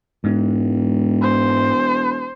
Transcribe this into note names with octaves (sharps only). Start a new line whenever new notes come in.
E1 G#2
C5